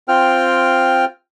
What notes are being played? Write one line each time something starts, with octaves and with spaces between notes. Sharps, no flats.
C4 F4 G5 F6